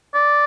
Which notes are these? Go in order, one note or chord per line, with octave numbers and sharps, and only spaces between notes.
D5